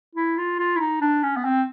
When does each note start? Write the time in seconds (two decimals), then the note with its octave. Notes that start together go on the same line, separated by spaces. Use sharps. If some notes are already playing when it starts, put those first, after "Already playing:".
0.15 E4
0.38 F4
0.59 F4
0.76 E4
0.80 D#4
1.01 D4
1.23 C#4
1.37 B3
1.45 C4